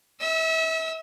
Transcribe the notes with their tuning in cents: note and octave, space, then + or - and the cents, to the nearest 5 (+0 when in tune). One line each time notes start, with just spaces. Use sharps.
E5 -35 E6 -5